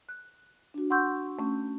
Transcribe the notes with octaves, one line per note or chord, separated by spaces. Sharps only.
F#6
D4 F#4
F#5 C6 C#6 E6 G6
A3 C#4